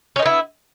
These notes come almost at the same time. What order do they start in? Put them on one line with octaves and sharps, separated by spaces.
C#4 D#4 B3 E4